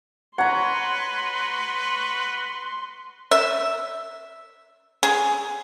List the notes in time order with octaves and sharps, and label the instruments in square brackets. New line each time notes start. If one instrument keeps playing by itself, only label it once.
[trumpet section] F#4 B4 [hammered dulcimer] C#5 A#5 [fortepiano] F#5 [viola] C6
[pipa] E5
G#4